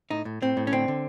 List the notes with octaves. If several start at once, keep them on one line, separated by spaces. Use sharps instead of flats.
A2 D#4
A2
A2 C4
A2
C#4
D3 C4
D3